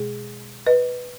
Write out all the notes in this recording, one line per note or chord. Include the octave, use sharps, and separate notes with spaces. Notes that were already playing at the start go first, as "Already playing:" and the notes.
Already playing: B2 G#3 G#4
B4 D#5